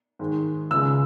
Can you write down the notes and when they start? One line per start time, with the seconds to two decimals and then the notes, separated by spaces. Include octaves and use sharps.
0.19 G#2 D#3 G#3
0.71 C#2 C#3 G#3 E6